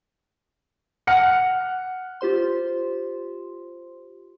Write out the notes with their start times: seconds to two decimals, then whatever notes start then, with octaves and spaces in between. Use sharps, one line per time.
1.07 F#5 F6 C#7
2.21 F4 G4 C5 C6